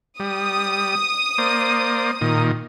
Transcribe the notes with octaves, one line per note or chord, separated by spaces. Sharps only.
G3 D#6
A#3 C5 D5
A#2 D#3